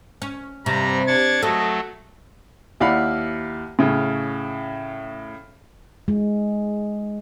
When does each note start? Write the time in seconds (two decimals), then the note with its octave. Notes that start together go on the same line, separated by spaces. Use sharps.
0.22 C#4
0.66 G2 C3 G3 A#5
1.07 D4 C#6 G#6 A6
1.42 F#3 A3 A4 D#5
2.80 D#2 E4 D5 F5 F#5 B5
3.79 A2 C#3
6.08 G#3